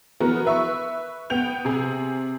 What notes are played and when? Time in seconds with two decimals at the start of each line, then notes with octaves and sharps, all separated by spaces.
0.20 E3 B3 F#4 A#4
0.45 B4 E5 C#6
1.30 B3 G5 G6 F7
1.65 C3 G#4